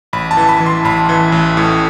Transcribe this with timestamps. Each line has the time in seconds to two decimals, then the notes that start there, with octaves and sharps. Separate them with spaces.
0.13 A1 B5
0.31 A5
0.37 E3
0.49 B5
0.60 E3
0.66 C6
0.85 A1 B5
1.09 E3
1.32 A1
1.57 A2